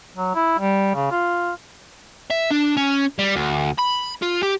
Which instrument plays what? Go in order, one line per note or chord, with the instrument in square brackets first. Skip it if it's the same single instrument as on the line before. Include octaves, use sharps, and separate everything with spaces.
[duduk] F#3
E4
G3
C#3
F4
[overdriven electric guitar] E5
D4
C#4
G3
D2
B5
F4
G4